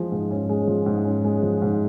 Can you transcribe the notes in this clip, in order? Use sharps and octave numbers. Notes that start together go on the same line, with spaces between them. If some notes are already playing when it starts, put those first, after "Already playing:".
Already playing: F3 G#3
G#2
C#4
G#3
F3
G#2
C#4
G#3
F3
G#2